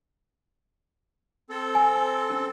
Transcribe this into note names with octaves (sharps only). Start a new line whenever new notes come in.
C4 A4
G#5
C#4